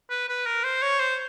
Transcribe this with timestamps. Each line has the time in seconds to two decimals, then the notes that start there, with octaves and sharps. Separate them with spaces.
0.10 B4
0.29 B4
0.46 A#4
0.64 C5
0.82 C#5
1.00 C5